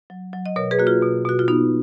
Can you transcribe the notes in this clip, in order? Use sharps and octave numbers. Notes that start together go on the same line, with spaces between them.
F#3
F#3
D#5
B2 A#4 C#5
G#4 B4
A#3 F#4
F4 G#4
B2
B2 F#4
F4
B3 D#4